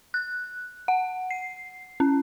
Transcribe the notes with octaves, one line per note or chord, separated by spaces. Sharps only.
F#6
F#5
C7
C#4